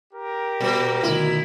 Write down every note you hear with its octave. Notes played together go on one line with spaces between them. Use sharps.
G4 A#4
A#2 G3 F#4
D2 B2 D#3 E4